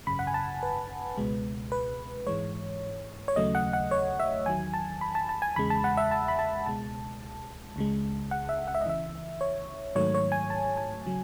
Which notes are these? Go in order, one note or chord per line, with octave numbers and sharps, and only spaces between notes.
G#1 F#2 C#3 B5
F#5
G#5
A5
B4
C#2 B2 G#3
B4
G#2 E3 G#3 C#5
C#5
D#2 C#3 F#3 A3 D#5
F#5
F#5
C#5
E5
E2 D#3 F#3 G#5
A5
B5
A5
A5
G#5
E2 C#3 G#3 B5
A5
F#5
E5
A5
B5
A5
C#2 B2 G#3 A5
C#2 C#3 G#3
F#5
E5
F#5
E5
D#5
C#2 C#3 E3 E5
C#5
G#2 D#3 F#3 A3 C#5
C#5
G#5
A5
G#5
C#3 F#3